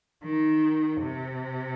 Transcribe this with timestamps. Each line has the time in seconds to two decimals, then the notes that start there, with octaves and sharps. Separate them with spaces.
0.24 D#3
1.02 C3